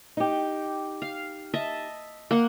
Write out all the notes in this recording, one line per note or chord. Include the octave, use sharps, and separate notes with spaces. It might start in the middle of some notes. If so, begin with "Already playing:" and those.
D#4 G4
F5
D#5 E5 A5
A#3 F#5